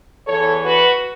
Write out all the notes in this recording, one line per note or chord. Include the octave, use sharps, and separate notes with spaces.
E2 E3 A4 C#5
F#4 B4